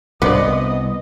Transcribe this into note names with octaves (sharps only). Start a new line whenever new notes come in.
C2 B3 D4 C5 D5 D#5